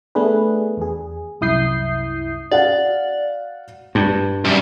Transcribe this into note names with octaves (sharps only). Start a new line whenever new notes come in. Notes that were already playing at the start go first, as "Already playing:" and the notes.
A3 B3 D4 G#4 B4
E2 G#4
C2 F#2 E4 D#6 G6 C7
F#4 D5 F5 F#5
G2
F#2 G3